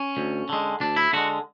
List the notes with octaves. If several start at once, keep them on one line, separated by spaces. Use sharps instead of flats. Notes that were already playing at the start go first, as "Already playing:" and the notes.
Already playing: C#4
D2
D3 G#3
D2 D4
E4
D3 G#3 F#4